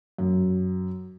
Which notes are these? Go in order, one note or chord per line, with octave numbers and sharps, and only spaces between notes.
F#2